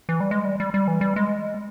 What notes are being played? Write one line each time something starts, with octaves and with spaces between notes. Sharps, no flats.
E3
G3
G#3
G3
G3
G3
E3
G3
G#3